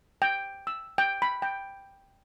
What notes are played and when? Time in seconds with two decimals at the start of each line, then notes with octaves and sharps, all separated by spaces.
0.22 G5
0.67 E6
0.98 G5
1.22 B5
1.42 G5